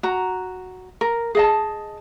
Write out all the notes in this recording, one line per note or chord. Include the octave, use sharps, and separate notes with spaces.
F#4 A#5
A#4
G#4 D#5 A5